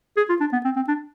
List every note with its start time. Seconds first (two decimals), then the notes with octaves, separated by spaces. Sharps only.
0.17 G#4
0.29 F4
0.41 D4
0.53 B3
0.65 C4
0.76 C4
0.88 D4